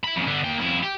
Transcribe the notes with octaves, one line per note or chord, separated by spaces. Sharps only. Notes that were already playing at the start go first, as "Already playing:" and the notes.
E4 B5
F2 C#3
D3 B3
A#3 G5
F2 E4
G4